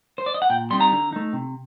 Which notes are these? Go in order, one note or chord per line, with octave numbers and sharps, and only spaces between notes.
C5
D5
D#5
F#5
A#2 G5
G3 C4 D#4 C6
A#5
D3
A3 D#4
C3